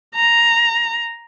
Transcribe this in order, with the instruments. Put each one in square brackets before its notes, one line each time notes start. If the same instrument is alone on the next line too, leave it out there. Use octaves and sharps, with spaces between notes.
[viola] A#5